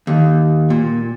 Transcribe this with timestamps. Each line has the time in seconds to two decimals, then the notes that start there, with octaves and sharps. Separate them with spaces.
0.07 D#2
0.70 A#2